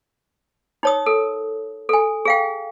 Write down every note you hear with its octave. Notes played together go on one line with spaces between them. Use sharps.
D#4 C#5 D#6
A4 A#4
A4 G#5
G#4 F5 G5